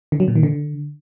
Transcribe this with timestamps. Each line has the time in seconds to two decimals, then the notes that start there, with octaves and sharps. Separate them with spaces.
0.12 D3
0.20 F#3
0.28 A#2
0.36 D#3
0.43 D3